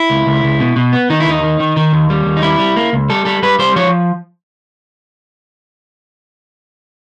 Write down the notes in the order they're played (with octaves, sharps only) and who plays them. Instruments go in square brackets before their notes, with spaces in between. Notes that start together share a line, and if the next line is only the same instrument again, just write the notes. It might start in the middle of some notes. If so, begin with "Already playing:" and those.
Already playing: [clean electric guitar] E4
C#2
C#2
C#2
B2
B2
B3
D#3 D#4
E4
D#2 D#4
D#3
D#3
D#3
D#2
G3
D#2
D#4
G3 E4
G3
A#3
C#2
G3 A4
G3 A4
G3 B4
G3 C5
F3 C#5